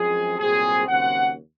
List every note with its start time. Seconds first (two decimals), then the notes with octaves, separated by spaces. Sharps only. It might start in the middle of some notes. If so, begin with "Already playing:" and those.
Already playing: F#2 F3 G#3 C4 G#4
0.39 C2 A#2 F#3 C4 G#4
0.88 D#2 C#3 F#3 C4 F#5